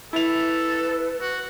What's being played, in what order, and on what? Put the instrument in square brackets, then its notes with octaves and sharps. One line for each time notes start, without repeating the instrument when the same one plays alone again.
[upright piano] E4 F7 [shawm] A4 [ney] B4
[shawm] F#4